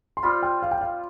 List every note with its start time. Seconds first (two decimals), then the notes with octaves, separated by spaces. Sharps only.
0.17 C6
0.23 G3 C4 F4 B5
0.43 G5
0.63 F5
0.71 G5
0.81 F5